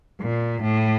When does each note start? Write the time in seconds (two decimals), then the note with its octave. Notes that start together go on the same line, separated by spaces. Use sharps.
0.21 A#2
0.62 A2